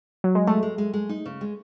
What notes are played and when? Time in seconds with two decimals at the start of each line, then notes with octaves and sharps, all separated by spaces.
0.24 F#3
0.35 G#3
0.47 G#3 A3
0.63 G#3
0.78 G#3
0.93 G#3
1.09 D#4
1.26 C#3
1.41 G#3